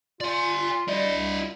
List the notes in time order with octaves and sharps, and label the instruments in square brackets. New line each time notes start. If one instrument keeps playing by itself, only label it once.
[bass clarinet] F4 [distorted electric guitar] D5 G#5
[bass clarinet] G3 [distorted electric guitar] E4 D#5
[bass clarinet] C2